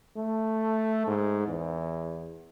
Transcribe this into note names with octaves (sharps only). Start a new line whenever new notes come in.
A3
G#2
E2